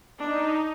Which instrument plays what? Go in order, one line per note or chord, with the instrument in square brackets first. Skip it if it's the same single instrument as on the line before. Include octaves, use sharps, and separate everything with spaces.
[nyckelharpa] D4 [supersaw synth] D#4